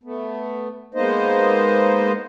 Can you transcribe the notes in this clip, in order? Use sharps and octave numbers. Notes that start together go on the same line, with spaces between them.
A3 B3
G#3 A#3 B3 D#4 C5 D#5